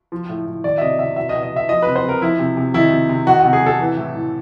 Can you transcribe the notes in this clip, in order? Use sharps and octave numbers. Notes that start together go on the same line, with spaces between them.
F3
A2
A2
D#3 D5
E5
C3 D#5
C3 E5
B2 E5
D#5
B2
D#5
B2 E5
F3 D#5
C3 B4
C5
C3 A#4
F3 E4
C3
C3
D#3 E4
C3
C3
D#3 F#4
C3 F#4
G#4
C3 A4
E3
A2
A2